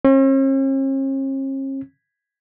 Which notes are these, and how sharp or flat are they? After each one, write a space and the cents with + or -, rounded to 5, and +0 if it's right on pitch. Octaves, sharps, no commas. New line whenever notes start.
C#4 -45